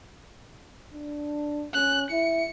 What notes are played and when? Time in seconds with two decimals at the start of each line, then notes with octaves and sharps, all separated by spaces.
0.93 D4
1.73 C#4 F#6
2.11 E4 C#7